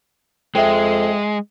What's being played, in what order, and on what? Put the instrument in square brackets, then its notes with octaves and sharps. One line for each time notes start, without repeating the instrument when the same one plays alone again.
[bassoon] F2 [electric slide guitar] G#3 [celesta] E5 G5